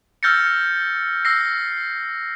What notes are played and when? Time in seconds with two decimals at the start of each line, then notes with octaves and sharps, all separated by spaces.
0.23 E6 F6 G6 A6 A#6 C#7
1.25 E6 A#6 C7